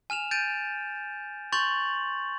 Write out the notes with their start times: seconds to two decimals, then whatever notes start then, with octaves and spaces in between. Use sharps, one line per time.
0.10 G#5 F6 E7 F7
0.31 G6 A6 D7 D#7
1.52 C6 C#6 G6 A6 F7 F#7